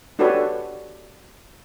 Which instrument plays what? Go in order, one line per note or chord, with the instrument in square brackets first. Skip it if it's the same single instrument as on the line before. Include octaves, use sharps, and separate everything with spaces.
[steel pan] D4 F#4 G4 A4 B4 C#5